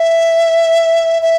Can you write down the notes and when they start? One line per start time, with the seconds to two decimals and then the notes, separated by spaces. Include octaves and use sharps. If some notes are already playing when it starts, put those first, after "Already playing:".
Already playing: E5
1.22 E5